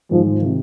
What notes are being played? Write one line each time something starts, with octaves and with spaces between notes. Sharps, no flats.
G#2 D#3 F3 G#3
C3 D#3